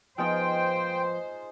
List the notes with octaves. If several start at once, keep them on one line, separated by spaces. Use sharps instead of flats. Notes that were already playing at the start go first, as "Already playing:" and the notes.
F3 G#3 B3 D#4 F4 C5 G5